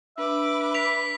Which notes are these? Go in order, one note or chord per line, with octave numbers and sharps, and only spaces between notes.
D4 B4 E5 D6
B6 F7